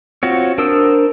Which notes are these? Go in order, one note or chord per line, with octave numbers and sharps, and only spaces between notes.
C4 F4 F#4 C#5
D4 A#4 C5 D#6 E6